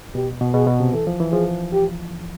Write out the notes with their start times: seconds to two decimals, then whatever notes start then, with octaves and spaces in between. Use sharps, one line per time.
0.15 B2 G4
0.41 B2
0.54 B2 G#4
0.67 B2
0.80 C3
0.93 E3 A4
1.07 F3
1.20 E3
1.32 F3 G#4
1.73 G4